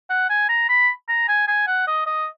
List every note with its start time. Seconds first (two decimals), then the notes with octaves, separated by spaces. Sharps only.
0.10 F#5
0.29 G#5
0.49 A#5
0.69 B5
1.08 A#5
1.28 G#5
1.47 G#5
1.67 F#5
1.87 D#5
2.06 D#5